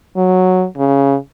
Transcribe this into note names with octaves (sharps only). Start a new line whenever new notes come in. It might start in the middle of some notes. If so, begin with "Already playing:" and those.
F#3
C#3